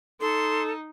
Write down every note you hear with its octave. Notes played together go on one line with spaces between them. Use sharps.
D#4 A4 C6